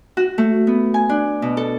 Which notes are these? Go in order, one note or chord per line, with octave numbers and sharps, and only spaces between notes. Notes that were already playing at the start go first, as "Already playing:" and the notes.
F#4
A3
B3
G#5
D4
B2
A4